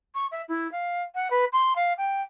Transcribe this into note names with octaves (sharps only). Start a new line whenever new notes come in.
C#6
E5
E4
F5
F#5
B4
C6
F5
G5